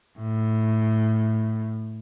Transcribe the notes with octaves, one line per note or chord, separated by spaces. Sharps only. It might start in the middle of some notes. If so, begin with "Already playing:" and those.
A2